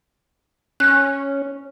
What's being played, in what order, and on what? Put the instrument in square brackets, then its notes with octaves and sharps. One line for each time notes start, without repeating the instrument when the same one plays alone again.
[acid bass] C#4 [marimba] F#6